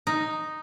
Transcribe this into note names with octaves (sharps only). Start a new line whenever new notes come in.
D#4